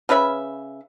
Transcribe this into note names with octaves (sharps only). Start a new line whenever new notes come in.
C#3 C#4 B4 E5